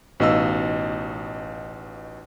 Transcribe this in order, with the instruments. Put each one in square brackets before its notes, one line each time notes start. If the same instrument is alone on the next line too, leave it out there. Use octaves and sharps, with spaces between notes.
[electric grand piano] A1 B2 D#4 D#5 F5 E6